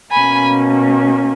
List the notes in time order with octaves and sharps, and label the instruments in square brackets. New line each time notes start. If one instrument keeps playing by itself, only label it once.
[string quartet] B2 A#3 C#4 G#5 B5